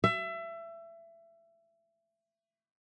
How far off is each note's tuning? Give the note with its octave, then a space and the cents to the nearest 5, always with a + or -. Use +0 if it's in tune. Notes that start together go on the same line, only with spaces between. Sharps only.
E5 +25